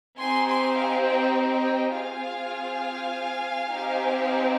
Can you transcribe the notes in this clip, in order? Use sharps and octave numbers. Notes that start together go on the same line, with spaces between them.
C4 D#4 G4 G#5 C6
G#5 C6
F5 G#5
D#5 G5
D#5 G5
C4 F4 G#4 F5 G#5
C4 D#4 G4